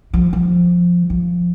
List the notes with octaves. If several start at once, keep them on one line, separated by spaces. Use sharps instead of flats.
F3
F3
F3